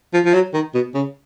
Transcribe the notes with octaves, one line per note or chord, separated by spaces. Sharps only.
F3
F3
F#3
D#3
B2
C#3